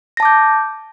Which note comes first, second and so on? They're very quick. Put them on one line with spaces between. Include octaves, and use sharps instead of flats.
A#6 A5 D6 G6